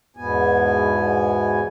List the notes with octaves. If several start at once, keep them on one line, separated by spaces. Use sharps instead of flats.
E2 G#2 B2 B3 G#5